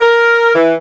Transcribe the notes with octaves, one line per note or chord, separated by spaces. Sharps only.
A#4
E3